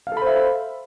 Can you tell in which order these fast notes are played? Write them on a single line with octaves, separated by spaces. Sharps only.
F5 A4 B5 C5 E5